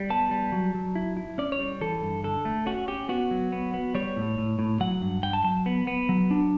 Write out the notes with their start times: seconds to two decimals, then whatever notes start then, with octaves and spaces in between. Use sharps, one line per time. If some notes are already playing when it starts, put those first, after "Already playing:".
Already playing: G3
0.10 B3 A5
0.31 G3
0.52 F#3
0.74 F#3
0.95 E4
1.17 E4
1.38 C#4 D5
1.52 C#5
1.60 G3
1.81 E3 A4
2.02 G2
2.24 D3 A4
2.45 A3
2.66 C#4 F#4
2.88 C#4 G4
3.09 B3 F#4
3.31 F#3
3.52 B3
3.74 B3
3.95 G3 C#5
4.16 A2
4.38 A2
4.59 A2
4.80 F#3 F#5
5.02 G2
5.23 G2 G5
5.33 A5
5.44 F#3 A5
5.66 B3
5.87 B3
6.09 F#3
6.31 D4